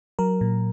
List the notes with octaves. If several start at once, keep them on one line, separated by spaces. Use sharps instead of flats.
F#3 A#4
A#2